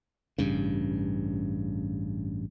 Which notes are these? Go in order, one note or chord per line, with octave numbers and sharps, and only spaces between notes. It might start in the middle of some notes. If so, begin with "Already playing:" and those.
A1 G2 C#3